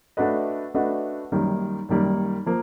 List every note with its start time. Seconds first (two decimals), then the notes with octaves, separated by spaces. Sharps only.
0.17 A3 D4 F#4 B4 D#5
0.74 A3 D4 F#4 B4 D#5
1.32 F#2 D#3 G3 A#3
1.89 F#2 D#3 G3 A#3
2.46 F3 A#3